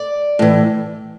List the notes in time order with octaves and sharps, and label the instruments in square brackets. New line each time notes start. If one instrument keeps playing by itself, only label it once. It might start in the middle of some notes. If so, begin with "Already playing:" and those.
Already playing: [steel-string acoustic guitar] D5
A2 E3